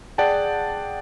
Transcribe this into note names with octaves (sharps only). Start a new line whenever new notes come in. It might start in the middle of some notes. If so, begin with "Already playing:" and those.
G#4 D5 F#5 G5 A5